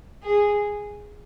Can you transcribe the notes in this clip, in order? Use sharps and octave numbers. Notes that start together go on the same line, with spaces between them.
G#4